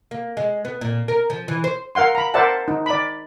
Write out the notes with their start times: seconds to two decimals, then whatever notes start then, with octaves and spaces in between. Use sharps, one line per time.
0.11 A#3
0.37 G#3
0.65 B3
0.81 A#2
1.08 A#4
1.30 F3
1.48 E3
1.64 C5
1.95 A#4 F5 F#5 C6
2.15 A#5 B5
2.34 A#4 C5 D5 E5 F#5 A5
2.68 D#4
2.86 D5 B5